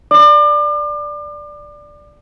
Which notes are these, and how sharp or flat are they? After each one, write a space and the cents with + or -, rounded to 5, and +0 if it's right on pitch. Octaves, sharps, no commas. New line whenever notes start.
D5 +0 D6 +35